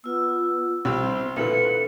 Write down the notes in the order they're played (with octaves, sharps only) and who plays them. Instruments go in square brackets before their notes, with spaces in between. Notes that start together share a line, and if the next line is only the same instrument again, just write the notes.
[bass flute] B3 [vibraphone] F4 E6
[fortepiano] C2 G4 E6 [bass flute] C4 [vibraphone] B5 [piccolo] C6
[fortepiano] A#2 D3 E3 [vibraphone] A4 E5 [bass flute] B4 [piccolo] C#7